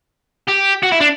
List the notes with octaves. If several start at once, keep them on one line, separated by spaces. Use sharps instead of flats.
G4
F#4
E4
D4